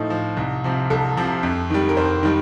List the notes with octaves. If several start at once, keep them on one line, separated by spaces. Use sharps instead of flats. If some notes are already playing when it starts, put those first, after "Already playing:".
Already playing: A2 F3 D#4
F3
C2
C3 F3
C2 A4
C3 F3
F2
D#3 G3
A#4
F2 C5
D#3 G3